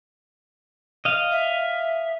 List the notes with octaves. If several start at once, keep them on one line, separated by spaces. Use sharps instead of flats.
D#5 F5
E5